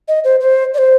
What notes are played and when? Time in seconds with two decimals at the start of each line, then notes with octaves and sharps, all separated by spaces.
0.08 D#5
0.24 C5
0.41 C5
0.74 D5
0.78 C5